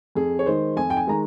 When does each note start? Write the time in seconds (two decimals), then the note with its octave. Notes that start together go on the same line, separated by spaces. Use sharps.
0.15 F2 G#4
0.39 C#5
0.46 D#3 G#3 C5
0.76 F2 G#5
0.90 G5
0.97 G#5
1.07 D#3 G#3 A#5